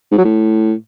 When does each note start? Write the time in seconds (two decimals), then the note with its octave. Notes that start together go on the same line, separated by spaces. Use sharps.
0.11 G#2
0.18 F#3
0.24 A2